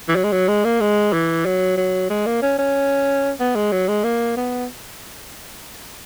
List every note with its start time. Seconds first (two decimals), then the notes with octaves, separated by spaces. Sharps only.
0.08 E3
0.16 F#3
0.24 G#3
0.32 F#3
0.48 G#3
0.65 A#3
0.81 G#3
1.13 E3
1.45 F#3
1.77 F#3
2.10 G#3
2.26 A#3
2.42 C#4
2.59 C#4
3.40 B3
3.56 G#3
3.72 F#3
3.88 G#3
4.04 A#3
4.37 B3